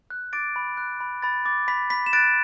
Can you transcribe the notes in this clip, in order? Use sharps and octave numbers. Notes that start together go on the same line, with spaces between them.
F#6
D6 A6 D7
B5
F#6
B5
B5 A6
D6 A6
B5 B6
B5 B6
E7
F#6 A6 D7